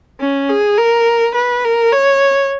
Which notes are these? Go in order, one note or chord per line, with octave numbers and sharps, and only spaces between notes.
C#4
G#4
A#4
B4
A#4
C#5